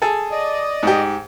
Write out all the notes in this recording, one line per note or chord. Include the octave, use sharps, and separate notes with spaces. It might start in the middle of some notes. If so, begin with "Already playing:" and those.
G#4 A4
D5 D#5
G#2 G4